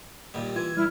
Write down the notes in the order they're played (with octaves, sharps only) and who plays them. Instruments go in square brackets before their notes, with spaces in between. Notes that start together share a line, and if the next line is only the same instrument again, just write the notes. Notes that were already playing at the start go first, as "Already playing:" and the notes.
[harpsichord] D#2 A#2 G3
[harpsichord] E3 [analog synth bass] F4 [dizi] G#6
[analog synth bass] G3 [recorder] E4 [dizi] F6